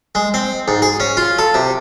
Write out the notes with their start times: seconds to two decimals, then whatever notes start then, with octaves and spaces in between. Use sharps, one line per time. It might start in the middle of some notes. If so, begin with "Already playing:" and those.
0.15 G#3
0.34 C4
0.68 G#2
0.82 G#4
1.00 C#4
1.17 F4
1.39 A4
1.54 C3